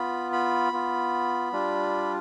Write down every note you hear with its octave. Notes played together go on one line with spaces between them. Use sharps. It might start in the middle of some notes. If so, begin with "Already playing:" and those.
Already playing: B3 F4 B5
B5
B3 F4
G3 D4 F4